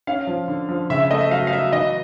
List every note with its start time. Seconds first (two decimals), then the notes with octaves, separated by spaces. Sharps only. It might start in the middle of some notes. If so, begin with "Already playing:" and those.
0.07 C#4 F5
0.27 F3
0.48 D3
0.69 F3
0.90 C#3 E5
1.00 E5
1.11 A3 D#5
1.21 E5
1.31 F#3 F5
1.47 F5
1.52 F#3 E5
1.72 E3 D#5